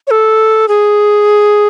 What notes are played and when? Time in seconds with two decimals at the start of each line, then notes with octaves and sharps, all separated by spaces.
0.07 C#5
0.11 A4
0.68 G#4